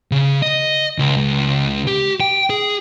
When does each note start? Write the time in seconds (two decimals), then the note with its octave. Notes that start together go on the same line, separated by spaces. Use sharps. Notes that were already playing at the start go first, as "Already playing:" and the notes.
0.11 C#3
0.42 D#5
0.99 C#2
1.17 C#2
1.87 G4
2.20 G5
2.50 G#4